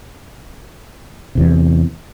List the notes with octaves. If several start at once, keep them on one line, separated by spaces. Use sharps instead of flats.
E2 C3